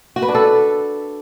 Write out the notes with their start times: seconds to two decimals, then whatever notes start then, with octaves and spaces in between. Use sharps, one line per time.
0.16 F#4
0.22 B4
0.28 D4
0.35 A4